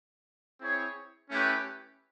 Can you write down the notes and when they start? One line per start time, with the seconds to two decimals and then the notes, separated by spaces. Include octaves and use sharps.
0.60 C4 E4 G#4 C#5
1.30 A3 C#4 E4 G4 B4